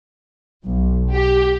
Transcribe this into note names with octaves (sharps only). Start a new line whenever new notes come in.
B1
G4